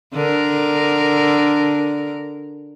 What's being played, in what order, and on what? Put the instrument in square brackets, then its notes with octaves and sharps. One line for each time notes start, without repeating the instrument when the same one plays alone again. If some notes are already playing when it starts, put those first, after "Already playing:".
[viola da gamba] D3 A#4